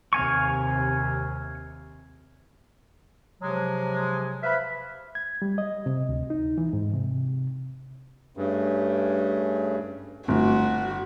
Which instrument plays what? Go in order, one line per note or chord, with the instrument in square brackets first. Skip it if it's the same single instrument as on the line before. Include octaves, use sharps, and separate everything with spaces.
[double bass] D#2 C3 [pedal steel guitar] F5 G#5 C#6
[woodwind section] C3 F3 F#3 G#3
B4 C5 E5 F5 B5
[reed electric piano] G#6
G3
D#5
C3
D2
D#4
E3
G#2
C3
[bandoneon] G2 [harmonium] A3 C#4 G#4
[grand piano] G1 [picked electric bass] A3 C4 [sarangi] F#4